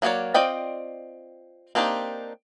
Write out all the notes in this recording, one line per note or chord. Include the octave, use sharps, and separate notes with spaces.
F#3 A#3 B3 C#5 D5
C4 F4 D5 D#5 G5
A#3 C4 D4 D#4 G4